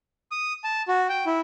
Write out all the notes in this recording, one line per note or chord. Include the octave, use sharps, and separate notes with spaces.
D#6
A5
F#4
G5
E4